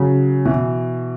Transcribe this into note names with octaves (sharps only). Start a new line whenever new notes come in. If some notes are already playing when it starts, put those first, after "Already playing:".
Already playing: C#3 F#3
B2 E3